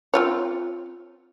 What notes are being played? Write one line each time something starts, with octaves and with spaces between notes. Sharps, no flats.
C4 F4 C#5